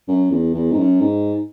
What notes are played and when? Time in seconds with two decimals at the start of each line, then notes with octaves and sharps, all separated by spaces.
0.08 F#2
0.31 E2
0.54 E2
0.72 G#2
0.78 F#2
1.00 G#2